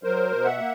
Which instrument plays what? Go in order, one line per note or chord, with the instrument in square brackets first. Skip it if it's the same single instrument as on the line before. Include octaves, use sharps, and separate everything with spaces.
[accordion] F#3 A#4 C5
B2
E5 F#5
A#3